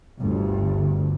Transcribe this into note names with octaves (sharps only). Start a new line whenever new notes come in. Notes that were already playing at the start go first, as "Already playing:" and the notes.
G1 D2 G2